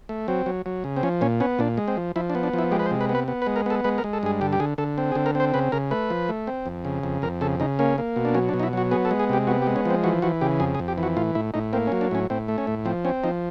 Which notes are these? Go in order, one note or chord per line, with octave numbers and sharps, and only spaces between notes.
A3
F#3 C4
F#3
F#3
C#3
C4
F3 C#4
A#2 C#4
B3 C#4
A#2 D4
G#3
C4
F3
F3 E4
D4
B3
D4
F3 E4
G#3 G4
B4
C5
C3
B4
B3
B4
B3
B4
G#3
A#4
B3 A4
G#3 B4
A#4
G#3
A4
G2 G#4
D3 G4
G4
D3 G#4
D3 A4
C4
G#4
D3
A#4
C4 C5
C#3 B4
C#3 A#4
A3 B4
F3
A3
C4
F2
C#3
F2
F2 A#4
C#3 A4
C#3 D#4
A#3 C#4
A#3
B2
D4
F#3 C#4
D4
B2
D#4
E4
F#3 F#4
B3 G#4
A4
G#3
G#4
C3 G4
B3 F#4
G4
G#3
C#4
F3 C4
E3 F#4
E3 F#4
C#3 G4
F2 G#4
G#4
F2
G4
E3
F#4
A2 F4
A2 E4
A2 D#4
A#3 C4
C#4
F#3
D4
A2 C#4
A2 C4
A3
C#4
A2
F3 C4
C4 C#4
F3 D#4